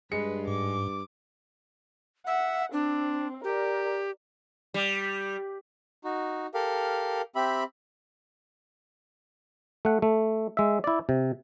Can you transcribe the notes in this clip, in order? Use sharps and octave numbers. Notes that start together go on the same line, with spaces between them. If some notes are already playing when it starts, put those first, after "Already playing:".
G2 G#3 B4 C#7
G#2 D6
E5 F#5
C4 D4
G4 A#4 D5
G3
D#4 F#4
G4 A4 A#4 F5
C4 G4 E5 B5
A3 F#5
A3
G#3 E5
E4 D5
C3